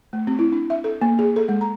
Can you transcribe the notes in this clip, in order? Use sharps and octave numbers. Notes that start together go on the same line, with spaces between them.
A3
C4
E4
D4
E5
A4
A#3
G#4
A4
G#3
A#5